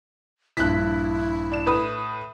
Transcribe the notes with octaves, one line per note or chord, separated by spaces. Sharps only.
A#1 G2 E4 F#6 B6
D4 E7
A2 B4 D#6